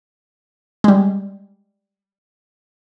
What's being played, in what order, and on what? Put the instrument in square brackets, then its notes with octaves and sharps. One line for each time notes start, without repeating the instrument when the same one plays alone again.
[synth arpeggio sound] G3 G#3